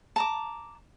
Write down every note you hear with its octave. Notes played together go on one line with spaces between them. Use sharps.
A5 A#5 D6